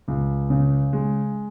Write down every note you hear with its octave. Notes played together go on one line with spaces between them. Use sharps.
C#2
C#3
G#3